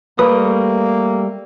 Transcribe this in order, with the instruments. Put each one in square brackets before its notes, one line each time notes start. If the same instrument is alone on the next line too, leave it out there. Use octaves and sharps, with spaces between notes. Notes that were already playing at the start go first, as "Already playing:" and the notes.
[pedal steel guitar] G3 A3 D#6 [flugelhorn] A#3 [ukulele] B4